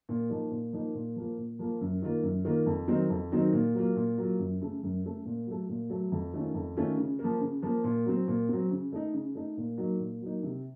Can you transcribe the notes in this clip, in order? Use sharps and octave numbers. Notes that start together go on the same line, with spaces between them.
A#2
F3 A#3 D#4
A#2
F3 A#3 D#4
A#2
F3 A#3 F4
A#2
F3 A#3 F4
F#2
D#3 A#3 F4
F#2
D#3 A#3 F4
F2
D#3 F#3 C4 D#4
F2
D#3 F#3 C4 D#4
A#2
F#3 A#3 F4
A#2
F#3 A#3 F4
F#2
C#3 A3
F#2
C#3 A3
A#2
F#3 A3
A#2
F#3 A3
F2
D#3 A3 C#4 F4
F2
D#3 A3 C#4 F4
C#3
F3 A#3
C#3
F3 A#3
A#2
F#3 C4
A#2
F#3 C4
C#3
A3 D#4
C#3
A3 D#4
A#2
F#3 A#3 D#4
A#2
F#3 A#3 D#4
C3